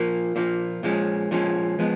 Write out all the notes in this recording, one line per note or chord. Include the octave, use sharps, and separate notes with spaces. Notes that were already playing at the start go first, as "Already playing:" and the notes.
Already playing: A#2 F3 A#3
A#2 F3 A#3
A#2 F3 G#3 C#4
A#2 F3 G#3 C#4
F3 G#3 B3